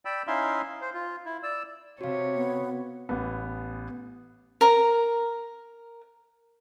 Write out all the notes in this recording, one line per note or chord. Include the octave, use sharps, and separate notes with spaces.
D5 G5 B5 E6
C#4 D#4 E4 E5 F5 C6
C5
F4
E4
D5 E6
C3 F#4 C#5 F5
B3
A1 B3
A#4 A#5